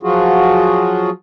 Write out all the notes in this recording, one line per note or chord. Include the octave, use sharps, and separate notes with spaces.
F3 F#3 F4 F#4 G#4